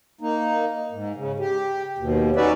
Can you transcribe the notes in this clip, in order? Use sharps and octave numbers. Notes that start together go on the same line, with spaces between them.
A#3 D#4
G#2
C#3
G4
D#2 B2
C#4 D#4 F#4 B4 D5 E5